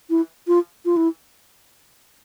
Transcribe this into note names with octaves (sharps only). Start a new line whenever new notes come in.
E4
F4
F4
E4